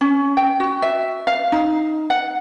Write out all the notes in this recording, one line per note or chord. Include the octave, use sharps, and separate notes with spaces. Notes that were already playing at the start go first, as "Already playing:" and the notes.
C#4
G5
F#4
E5
F5
D#4
F#5